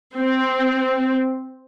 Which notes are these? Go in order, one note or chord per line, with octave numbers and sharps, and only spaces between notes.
C4